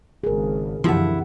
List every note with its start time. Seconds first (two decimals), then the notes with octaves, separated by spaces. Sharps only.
0.24 G#1 C#3 G#4 A#4
0.84 C2 F#2 D3 E3 F3 E4 G4 F#5